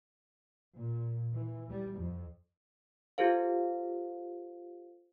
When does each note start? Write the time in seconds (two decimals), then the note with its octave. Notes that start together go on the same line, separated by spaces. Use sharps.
0.75 A#2
1.33 E3
1.70 G3
1.99 F2
3.18 F4 G4 A4 C5 F5